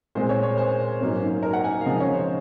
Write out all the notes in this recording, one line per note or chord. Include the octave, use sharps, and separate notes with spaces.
A#2 G#3 C4 C5
C#5
C#5
C5
G#2 F#3 A#3 C#4
A#4
F#5
G#5
F5
C#3 F3 G#3 D#5
C#5
C5